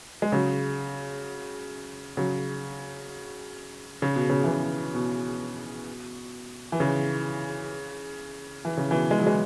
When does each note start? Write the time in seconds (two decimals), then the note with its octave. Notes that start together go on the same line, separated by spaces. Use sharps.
0.22 G#3
0.32 C#3 F#3
2.17 C#3 F#3
4.02 C#3
4.16 B2
4.30 C#3
4.44 E3
4.49 C#3
4.95 B2
6.72 E3
6.80 C#3
8.65 E3
8.77 C#3
8.91 B2 E3
9.11 G#3
9.19 F#3
9.27 E3 G#3